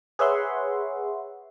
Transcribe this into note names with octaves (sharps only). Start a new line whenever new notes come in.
G#4 B4 C#5 E5 F#5 C6